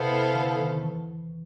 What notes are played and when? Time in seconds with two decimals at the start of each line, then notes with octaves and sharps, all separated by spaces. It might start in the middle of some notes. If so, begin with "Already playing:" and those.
Already playing: C3 B3 E4 A4 C5 F5
0.35 D3
0.59 D#3
0.83 E3